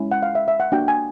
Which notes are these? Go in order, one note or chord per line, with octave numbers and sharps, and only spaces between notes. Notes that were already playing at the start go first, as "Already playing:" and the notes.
Already playing: G#3 C#4 E4
F#5
F5
E5
E5
F#5
A#3 D4 F#4 G5
G#5